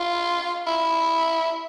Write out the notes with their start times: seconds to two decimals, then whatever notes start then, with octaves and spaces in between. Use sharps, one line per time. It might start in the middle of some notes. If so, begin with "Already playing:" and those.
Already playing: F4
0.67 E4